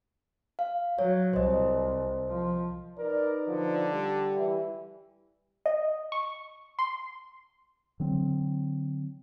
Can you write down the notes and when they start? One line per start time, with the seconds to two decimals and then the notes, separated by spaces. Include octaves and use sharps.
0.59 F5
0.99 F#3 C#5
1.33 C2 C5 D#5
2.29 F3
2.98 D#4 A#4 B4 D5
3.47 D3 F3
3.92 G3
4.36 E3 E4
5.66 D#5
6.12 C#6
6.79 C6
8.00 D3 F#3 C4